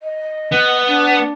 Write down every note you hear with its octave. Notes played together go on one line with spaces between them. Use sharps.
D#5
B3
D4